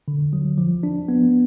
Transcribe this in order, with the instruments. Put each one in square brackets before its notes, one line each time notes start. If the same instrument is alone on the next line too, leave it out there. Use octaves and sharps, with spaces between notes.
[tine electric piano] D3
F#3
F3
D4
B3